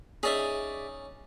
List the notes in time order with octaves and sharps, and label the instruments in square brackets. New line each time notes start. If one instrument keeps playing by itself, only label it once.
[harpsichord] C#4 D#4 [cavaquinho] G#4 D5 E5